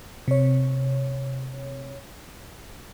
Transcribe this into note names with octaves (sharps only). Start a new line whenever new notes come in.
C3 C#5